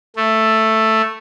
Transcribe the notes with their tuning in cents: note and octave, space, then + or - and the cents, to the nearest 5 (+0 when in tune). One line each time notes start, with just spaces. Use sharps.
A3 +5